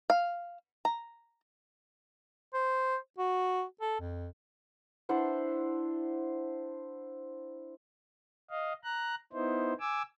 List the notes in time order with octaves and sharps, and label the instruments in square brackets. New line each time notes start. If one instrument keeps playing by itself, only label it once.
[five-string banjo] F5
A#5
[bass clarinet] C5
F#4
A4
F2
[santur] D4 E4 C5 F#5
[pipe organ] D#5 F5
A#5 F#6
B3 D#4 E4 C5
G#5 D6 E6